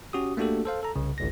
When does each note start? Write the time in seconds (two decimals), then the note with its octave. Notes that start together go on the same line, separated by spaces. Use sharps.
0.13 C#4 F#4 G4 D#6
0.37 A3 A#3 D4 F#4 G4 A4
0.65 A4 C5 F5
0.83 A4 A#5
0.96 C2 C#3
1.18 G#1 C#2 A#6